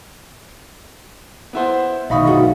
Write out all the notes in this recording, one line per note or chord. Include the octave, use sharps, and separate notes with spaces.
B3 E4 C5
B1 D#3 D#4 E5 F5 B5 C#6 D#6
D#2 D3 G#3 F#4 F5